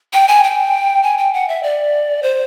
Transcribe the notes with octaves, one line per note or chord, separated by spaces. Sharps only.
G5
G#5
G5
G#5
G5
F#5
E5
D5
C5